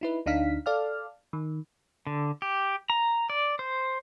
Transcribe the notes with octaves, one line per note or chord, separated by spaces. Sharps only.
D#4 E4 B4
D2 D4 D#4 F5 B6
A4 D5 F5 F6
D#3
D3
G4
A#5
D5
C5